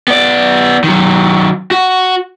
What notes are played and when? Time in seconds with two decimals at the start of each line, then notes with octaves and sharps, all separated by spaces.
0.08 B3 D5
0.84 D#3 F#3
1.71 F#4